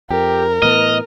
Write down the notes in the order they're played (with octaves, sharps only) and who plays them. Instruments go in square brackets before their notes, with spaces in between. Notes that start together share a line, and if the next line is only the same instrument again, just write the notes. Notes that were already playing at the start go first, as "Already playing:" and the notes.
[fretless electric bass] F2 [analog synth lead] G4 [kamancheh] A#4
[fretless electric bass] A2 E3 B3 [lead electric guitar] D#5 [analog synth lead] F6